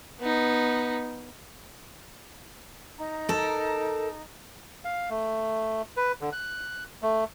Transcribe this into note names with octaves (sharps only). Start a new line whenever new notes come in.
B3 D#4
D#4 A#5
A4 A#4
F5
A3
B4
D3
F#6
A3